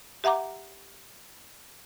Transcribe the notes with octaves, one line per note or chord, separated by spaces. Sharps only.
G4 E5 F#5 A#5 D6